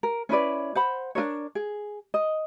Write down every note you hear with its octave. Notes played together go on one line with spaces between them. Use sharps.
A#4
C#4 E4 B4 D5
C5 F#5 B5
D4 F4 A#4 C#5
G#4
D#5